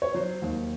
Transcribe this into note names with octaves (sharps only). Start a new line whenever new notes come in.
C#5
F#3 C5
D#2